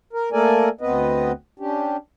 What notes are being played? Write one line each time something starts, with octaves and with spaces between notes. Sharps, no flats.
A#4
A3 A#3 A4 A#4 D5 G#5
D2 B3 C4 B4 D#5
C#4 D4 G4